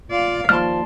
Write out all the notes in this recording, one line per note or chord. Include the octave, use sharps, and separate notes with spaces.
F4 D5 F5
D#2 F3 D5 A5 C6 F6